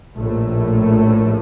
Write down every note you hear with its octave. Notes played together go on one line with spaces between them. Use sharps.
A#1 A2 A3